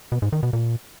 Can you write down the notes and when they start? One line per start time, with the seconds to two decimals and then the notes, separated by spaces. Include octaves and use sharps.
0.12 B2
0.22 G#2
0.32 D#3
0.43 B2
0.53 A#2